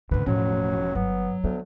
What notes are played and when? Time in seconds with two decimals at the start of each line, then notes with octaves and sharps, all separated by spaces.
0.11 D2 G#2 C#3 B4
0.27 E1 A2 F3 F#3 C#4
0.95 G1 F#3 B3
1.44 D2 B3